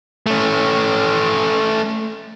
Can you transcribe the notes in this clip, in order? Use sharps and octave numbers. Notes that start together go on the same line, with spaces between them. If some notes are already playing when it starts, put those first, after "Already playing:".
A3 C#4